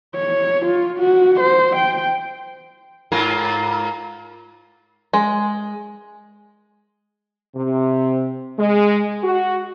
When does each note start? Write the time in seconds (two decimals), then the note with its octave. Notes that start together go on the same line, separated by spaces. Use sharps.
0.16 C#5
0.66 F4
0.99 F#4
1.40 C5
1.76 G5
3.12 G#2 F4 A#4
5.13 G#3
7.56 C3
8.58 G#3
9.24 F#4